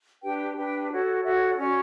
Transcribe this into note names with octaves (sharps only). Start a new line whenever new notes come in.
D4 G4 B4 G5
D4 G4 B4 G5
F#4 A4 C#5
F#4 A4 C#5 E5
C#5
C#5
C#4 F#4 C#5 D5